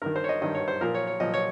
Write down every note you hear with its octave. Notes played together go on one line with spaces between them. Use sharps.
G2 D#3 A#4
C5
C#5
D#5
G2 D#3 D#5
C#5
C5
A#2 F3 A#4
C#5
C#5
A#2 F3 D#5
C#5